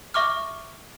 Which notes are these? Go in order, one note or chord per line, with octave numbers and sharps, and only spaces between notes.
E5 C#6 D6 F6